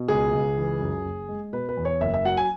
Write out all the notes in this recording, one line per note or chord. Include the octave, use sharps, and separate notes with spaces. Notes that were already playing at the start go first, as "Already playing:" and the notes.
Already playing: B2
C#2 G#4
C#2
E3
F#2
F#1
G#3
B2 B4
B4
E2
C#5
F#1 E5
E5
F#3 F#5
G#5